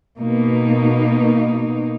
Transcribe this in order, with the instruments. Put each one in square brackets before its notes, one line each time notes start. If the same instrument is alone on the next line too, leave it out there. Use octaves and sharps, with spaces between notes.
[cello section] B2 A#3 D#4